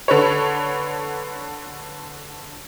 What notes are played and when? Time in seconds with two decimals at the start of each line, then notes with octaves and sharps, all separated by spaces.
0.08 D3 B4 C#5